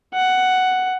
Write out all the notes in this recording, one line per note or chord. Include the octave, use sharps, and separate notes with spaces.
F#5